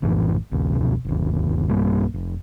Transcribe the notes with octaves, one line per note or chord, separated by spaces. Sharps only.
A#1 F#2 A2 E3
A#1 D#2
F1 C#2 B2 F3
G1 D#2
B1 G2 G3 A#3
F1